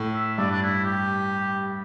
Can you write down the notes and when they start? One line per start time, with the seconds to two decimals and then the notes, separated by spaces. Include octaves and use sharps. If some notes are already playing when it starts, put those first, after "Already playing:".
Already playing: A2
0.15 E5
0.38 G2 D5
0.51 D4
0.62 E4
0.84 G4